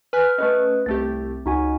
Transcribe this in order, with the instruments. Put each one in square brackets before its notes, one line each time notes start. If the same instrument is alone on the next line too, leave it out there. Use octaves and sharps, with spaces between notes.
[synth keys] B4 G#5 F#6 [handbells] F6
[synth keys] A3 C#4 [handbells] B4 D#5
[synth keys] C2 A3 G4 [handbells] A6
[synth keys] C#2 [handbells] D#4 F#4 G#5